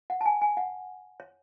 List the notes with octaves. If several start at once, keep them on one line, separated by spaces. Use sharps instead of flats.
F#5
A5
G#5
G#5
F#5
C#5